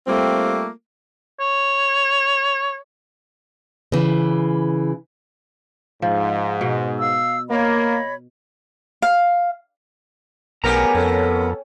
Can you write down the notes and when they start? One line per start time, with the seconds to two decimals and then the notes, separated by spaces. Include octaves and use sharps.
0.07 G3 A3 A#3 C4 F4
1.40 C#5
3.92 C#3 E3
6.02 G#2 F3
6.61 B2
7.00 F5 E6
7.50 A#3 C#5 D#5 B5
9.02 F5
10.64 B1 B3 C#4 G4 G#4 A#4 A#5
10.95 F2 C#4 A4